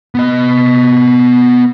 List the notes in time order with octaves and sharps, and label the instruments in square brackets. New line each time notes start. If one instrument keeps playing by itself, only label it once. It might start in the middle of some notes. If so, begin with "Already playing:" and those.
[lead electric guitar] B3 D#5